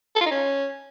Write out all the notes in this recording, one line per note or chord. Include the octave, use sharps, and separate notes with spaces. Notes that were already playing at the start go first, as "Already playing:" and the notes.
A4
F4
D#4
C#4